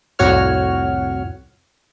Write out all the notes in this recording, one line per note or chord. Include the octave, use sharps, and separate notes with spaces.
C2 F2 A2 F#4 C#5 F6